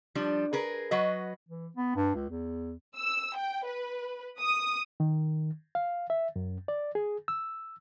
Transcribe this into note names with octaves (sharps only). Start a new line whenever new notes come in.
F3 G3 D4
G#4 A#4 B4
F#3 F#4 B4 D#5
E3
B3
G2
C#2
E2
E6
G5
B4
D#6
D#3
F5
E5
F#2
D5
G#4
E6